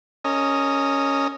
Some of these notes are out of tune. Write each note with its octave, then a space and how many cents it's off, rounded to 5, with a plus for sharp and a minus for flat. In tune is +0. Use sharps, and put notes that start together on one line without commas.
C#4 +0 A#4 -30 D#5 +0